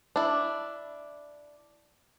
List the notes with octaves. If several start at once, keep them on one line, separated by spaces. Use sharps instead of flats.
D4 E4